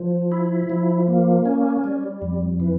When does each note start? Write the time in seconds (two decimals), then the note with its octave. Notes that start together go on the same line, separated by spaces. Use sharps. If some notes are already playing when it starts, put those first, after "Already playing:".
Already playing: F3
0.32 E4
0.70 F3
1.08 A#3
1.45 C#4
1.84 G3
2.22 F2
2.60 E3